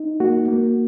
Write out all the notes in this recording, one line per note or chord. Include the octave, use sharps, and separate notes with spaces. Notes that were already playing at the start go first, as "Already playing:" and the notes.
Already playing: D#4
A#3 F#4
A#3